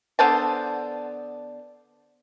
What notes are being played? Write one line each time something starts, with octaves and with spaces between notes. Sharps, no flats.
D3 B3 C5 A5